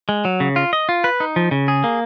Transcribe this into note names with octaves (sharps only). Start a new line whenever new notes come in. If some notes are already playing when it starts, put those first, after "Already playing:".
G#3
F#3
C#3
F4
D#5
F4
B4
D#4
F3
C#3
G#4
A#3